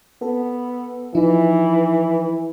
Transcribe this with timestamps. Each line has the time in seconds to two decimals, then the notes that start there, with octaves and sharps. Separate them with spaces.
0.22 B3 A4
1.15 E3 F3 D#4 E4